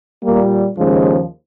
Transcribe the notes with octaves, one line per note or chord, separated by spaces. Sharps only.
A#2 G3 A#3
D#2 C#3 F3 G#3